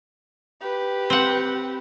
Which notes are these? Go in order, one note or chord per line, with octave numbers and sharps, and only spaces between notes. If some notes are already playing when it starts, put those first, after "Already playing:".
G4 B4
C4 F#5